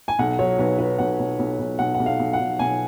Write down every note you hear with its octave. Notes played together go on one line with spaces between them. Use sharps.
G#5
B1 F#5
F#3 C#5
B1 B4
F#3 B4
B1 F#5
B1
B1
B1
B1 F#5
F#5
B1
F5
B1
F#5
B1
B1 G#5